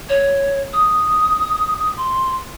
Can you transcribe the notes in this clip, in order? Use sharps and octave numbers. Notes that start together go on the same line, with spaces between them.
C#5
D#6
C6